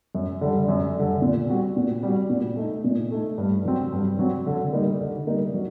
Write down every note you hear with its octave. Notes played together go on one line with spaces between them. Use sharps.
F#2
D3 G3
F#2
D3 G3
A#2
G3 C4 F#4
A#2
G3 C4 F#4
A#2
A3 D#4
A#2
A3 D#4
G2
F#3 C4
G2
F#3 C4
D3
G3 A#3 D#4
D3
G3 A#3 D#4
F#3